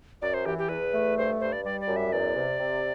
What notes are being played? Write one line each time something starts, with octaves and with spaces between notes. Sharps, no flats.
F#2 D5
C5
E3 G4
G4
E2 B4
A3
G2 C5
G2 C5
D5
G3 D5
D5
F#2
E5
E2 D5
C3
C3